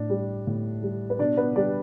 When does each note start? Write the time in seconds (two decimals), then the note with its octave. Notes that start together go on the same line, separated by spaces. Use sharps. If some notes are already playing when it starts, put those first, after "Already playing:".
Already playing: A2 D4
0.10 G3
0.47 A2
0.83 G3
1.10 B4
1.19 B2 D4 D5
1.37 B3 B4
1.56 G3 D4 D5